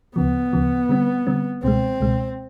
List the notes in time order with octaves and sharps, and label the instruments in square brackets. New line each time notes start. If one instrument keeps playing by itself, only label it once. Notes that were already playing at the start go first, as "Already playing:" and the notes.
[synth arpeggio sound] D2 C#3 F3 [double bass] B3
[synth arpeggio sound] D2 C#3 F3
D3 G3 C4
D3 G3 C4
[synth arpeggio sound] C#2 B2 G#3 [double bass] C4
[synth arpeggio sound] C#2 B2 G#3